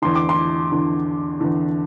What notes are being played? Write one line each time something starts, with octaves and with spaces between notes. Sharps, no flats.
E2 D3 C6
D6
C6
E2 D3
E2 D3